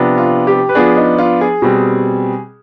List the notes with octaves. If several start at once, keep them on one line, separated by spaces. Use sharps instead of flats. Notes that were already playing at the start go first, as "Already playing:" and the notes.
Already playing: C3 F3 B3 D4
F4
G4
B4
F3 B3 D4 G#4
D#4
F4
G#4
B2 G3 C4